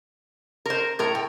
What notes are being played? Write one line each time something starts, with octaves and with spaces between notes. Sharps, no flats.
A#4 C5
A2 A#4 A#5
G5